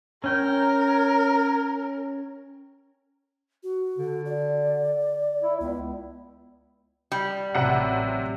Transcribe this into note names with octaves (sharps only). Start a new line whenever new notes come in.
C#4 A#4 G5
F#4
D3
D5
E4
C#2 B3
G3
A1 C3 F#3 F#5